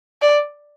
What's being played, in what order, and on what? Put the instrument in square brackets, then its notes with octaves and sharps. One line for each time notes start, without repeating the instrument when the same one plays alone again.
[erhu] D5